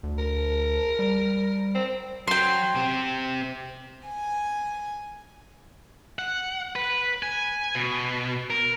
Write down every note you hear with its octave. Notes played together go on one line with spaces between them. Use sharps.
D2
A#4
G3
C4
F#3 G5 C6
C4 G4
G#5
F#5
B4
G#5
B2
A#4